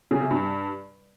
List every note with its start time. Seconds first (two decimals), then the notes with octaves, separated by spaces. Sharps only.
0.11 C#3
0.21 C3
0.31 G2